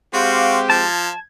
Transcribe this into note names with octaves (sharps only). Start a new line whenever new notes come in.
G#3 C4 F#4 G4 F5 C6 D6
F3 A5 G#6